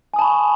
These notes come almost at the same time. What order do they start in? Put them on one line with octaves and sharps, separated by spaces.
G#5 D#6 A5 B5 C#6